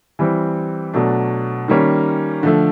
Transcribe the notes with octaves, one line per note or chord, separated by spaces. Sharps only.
E3 G3 C4
B2 F#3 A3 D4
D#3 G3 A#3 C#4
D3 F3 A3